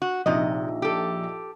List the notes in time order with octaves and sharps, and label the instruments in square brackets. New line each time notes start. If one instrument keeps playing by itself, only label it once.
[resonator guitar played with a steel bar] F#4
[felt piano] A#1 D#4 E5 [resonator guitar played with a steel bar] C3 D#5
[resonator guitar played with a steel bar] G4 A4